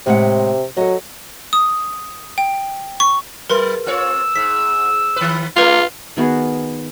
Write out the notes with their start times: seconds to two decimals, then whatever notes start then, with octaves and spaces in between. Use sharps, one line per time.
0.06 A2 C3 G#3 F#5
0.77 F#3 A4 D#5
1.53 D#6
2.38 G5
3.00 C#6
3.50 F#3 A#4 B4 C6
3.86 C4 F4 C#5 E6
4.36 G#2 B6
5.16 D#3 B4
5.56 G#3 A3 F4 B4 F7
6.17 D#3 B3 F#4 G#4